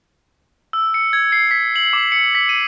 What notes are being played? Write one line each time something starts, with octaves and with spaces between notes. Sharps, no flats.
E6
C#7
G#6
C7
B6
F#7
D6
C#7
B6
D#7